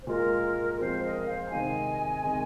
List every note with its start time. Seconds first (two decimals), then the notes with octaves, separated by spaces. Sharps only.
0.01 C5
0.06 A#2 G#3 F4 A#4
0.79 F3 G#3 C4 F4 C5
1.03 A#4 D#5
1.26 C5 F5
1.45 A#5
1.51 C3 D#3 G#3 C4 D#4 D#5 G#5
2.23 C3 D#3 G#3 D#4